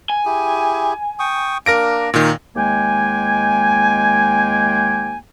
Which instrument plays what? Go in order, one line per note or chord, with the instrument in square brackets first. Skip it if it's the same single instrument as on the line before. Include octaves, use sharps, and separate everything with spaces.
[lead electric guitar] G#5
[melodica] E4 G4 G#4
G5 C#6 D#6
[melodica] A#3 D4 [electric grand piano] A#4 A#6 D7
[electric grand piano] A#2 D#3
[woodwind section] D#2 G#3 A#3 G5 G#5